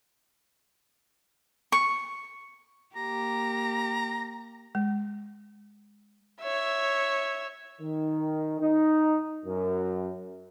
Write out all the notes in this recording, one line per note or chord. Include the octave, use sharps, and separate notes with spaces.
C#6
A#3 G4 A#5
G#3
C#5 E5
D#3
D#4
F#2